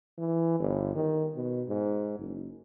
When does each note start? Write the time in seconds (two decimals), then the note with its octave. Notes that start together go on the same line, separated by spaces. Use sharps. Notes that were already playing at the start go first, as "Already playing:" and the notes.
0.18 E3
0.60 G1
0.95 D#3
1.36 B2
1.68 G#2
2.20 F#1